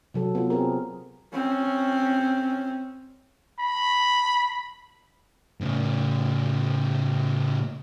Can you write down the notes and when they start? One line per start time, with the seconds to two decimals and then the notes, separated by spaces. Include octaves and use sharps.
0.14 C3 F#3 A4
0.35 B3 F4
0.50 C4 G4 G#4 A#4
1.33 C4 C#4
3.59 B5
5.61 A2 C#3